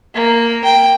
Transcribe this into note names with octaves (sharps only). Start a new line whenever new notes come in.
A#3
G5